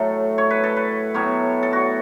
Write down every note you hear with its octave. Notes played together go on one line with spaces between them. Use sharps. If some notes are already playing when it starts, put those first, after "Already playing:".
Already playing: A2 F#3 A3 A4
C#5
B4
A4
B4
A2 F#3 B3 C#5
A4
F#4